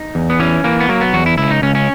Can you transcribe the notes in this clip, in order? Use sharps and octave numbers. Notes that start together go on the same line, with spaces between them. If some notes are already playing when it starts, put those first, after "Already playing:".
Already playing: D#4
E2
B3
E3 C#4
E3 A#3
B3
F#3 A#3
B3
E2 F#4
E4
C#2 E4
D#4
C#2 C#4
C#4